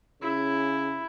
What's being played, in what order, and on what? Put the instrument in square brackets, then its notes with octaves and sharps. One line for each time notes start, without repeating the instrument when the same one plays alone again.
[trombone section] C#3 [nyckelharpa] E4